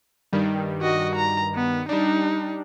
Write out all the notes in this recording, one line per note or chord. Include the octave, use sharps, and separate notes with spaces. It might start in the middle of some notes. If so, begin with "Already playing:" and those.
G2 D#3 G3
F#4 D#5
A#5
B3
G3 D4 D#4